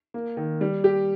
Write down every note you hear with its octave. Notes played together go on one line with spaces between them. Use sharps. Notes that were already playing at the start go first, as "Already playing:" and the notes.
A#3
D#3
G3
G4